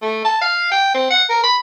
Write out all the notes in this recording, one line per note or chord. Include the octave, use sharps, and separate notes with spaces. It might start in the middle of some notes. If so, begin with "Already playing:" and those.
A3
A5
F5
G5
C4
F#5
A#4
B5